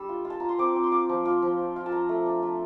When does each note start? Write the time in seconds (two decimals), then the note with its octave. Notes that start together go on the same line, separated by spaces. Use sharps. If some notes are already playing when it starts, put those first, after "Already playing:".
Already playing: G3 D4 D6 E6
0.09 F4
0.25 F4
0.30 A5
0.40 F4 A#5
0.49 C6
0.58 C4 D6
0.76 C4
0.84 C6
0.92 F4 D6
1.09 F3
1.25 F4 D6
1.42 F3
1.59 F4
1.76 F4
1.86 A5
1.92 F4 A#5
2.09 A3
2.26 D4
2.43 A3